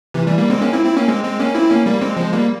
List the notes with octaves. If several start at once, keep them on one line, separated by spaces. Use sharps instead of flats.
C3 E3
E3 G3
G3 A#3
G#3 C4
A#3 C#4
C4 E4
C4 E4
A#3 C#4
G#3 C4
G#3 C4
A#3 C#4
C4 E4
A#3 C#4
G3 A#3
G#3 C4
F3 G#3
G3 A#3